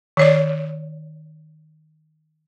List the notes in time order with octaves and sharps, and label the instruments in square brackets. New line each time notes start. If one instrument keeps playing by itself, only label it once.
[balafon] D#3 C#5 D5